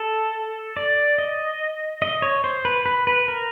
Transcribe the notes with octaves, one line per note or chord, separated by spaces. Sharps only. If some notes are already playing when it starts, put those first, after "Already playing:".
Already playing: A4
D5
D#5
D#5
C#5
C5
B4
B4
B4
A#4